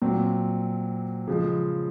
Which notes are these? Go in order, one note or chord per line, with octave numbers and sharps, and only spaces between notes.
A#2 F#3 C4
C#3 F3 G#3